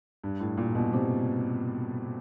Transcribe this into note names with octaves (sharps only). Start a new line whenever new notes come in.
G2
A2
A#2
B2
C3